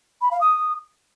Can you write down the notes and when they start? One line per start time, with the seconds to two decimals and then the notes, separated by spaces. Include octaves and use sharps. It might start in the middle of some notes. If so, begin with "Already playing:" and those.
0.21 B5
0.31 F5
0.41 D#6